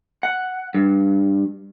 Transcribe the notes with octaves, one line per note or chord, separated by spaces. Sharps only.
F#5
G2